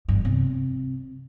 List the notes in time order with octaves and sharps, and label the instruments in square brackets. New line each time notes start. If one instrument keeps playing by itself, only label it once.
[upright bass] G2
C3